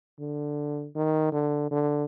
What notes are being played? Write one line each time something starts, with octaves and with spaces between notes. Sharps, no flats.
D3
D#3
D3
D3